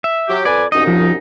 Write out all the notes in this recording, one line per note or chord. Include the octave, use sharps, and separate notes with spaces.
E5
F#3 G4
F2 B4 D5 G#5
C2 F#2 D#4 D#5
F3